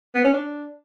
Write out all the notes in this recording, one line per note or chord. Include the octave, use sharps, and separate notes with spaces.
B3
C#4
D4